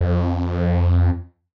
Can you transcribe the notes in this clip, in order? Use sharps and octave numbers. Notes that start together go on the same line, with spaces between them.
F2